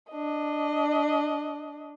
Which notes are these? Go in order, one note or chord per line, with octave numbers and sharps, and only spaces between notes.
D4 D#5